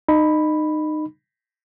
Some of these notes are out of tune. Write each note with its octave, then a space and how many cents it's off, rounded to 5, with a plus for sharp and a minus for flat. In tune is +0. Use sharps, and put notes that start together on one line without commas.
D#4 -25 B5 +0